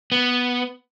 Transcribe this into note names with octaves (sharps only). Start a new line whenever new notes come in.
B3